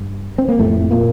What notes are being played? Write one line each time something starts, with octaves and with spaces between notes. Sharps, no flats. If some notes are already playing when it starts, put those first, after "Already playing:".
Already playing: G2
C4
A#3
F1 F2 A2 C3 A3
A#2 A#3